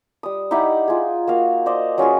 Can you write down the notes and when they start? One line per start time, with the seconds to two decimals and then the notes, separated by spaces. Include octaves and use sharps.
0.23 G3 D#6
0.51 D#4 E4 G4 F#5
0.88 F4 G#4
1.27 A#3 F#4 F5
1.66 C5 D5 D#5
1.98 F#3 C#4 F4 G#4